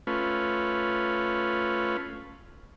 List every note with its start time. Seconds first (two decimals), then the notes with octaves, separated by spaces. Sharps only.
0.07 A3 C#4 F4 B4